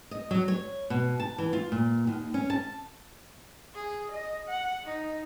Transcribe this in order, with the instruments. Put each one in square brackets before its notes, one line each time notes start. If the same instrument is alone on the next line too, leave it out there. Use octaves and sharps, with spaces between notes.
[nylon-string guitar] D#5
F#3
C#5
B2
A5
E3
F4
A#2
D#2
C#4
A5
[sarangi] G#4
D#5
F#5
D#4